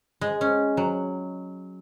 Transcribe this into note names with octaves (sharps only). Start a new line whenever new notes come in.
G#3
C#4
F#3